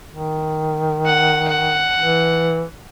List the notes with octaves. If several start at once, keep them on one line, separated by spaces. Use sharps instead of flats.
D#3
F#5
F#5
E3